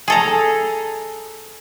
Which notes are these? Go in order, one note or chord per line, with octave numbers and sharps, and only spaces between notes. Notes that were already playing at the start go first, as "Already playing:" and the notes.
G#4 A4 A#5